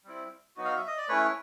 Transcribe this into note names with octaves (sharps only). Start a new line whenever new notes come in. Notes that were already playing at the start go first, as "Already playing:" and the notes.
G3 C4 E4
F#3 B3 D#4 F#4
F5
E5
D#5
D5
A3 C#4 E4 B4 C#5